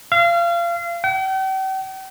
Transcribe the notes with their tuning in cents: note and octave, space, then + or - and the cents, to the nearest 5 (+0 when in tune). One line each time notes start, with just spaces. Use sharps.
F5 -30
G5 -45